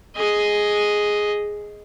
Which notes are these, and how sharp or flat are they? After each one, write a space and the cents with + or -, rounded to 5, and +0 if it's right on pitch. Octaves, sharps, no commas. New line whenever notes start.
G#4 +0 D#5 +0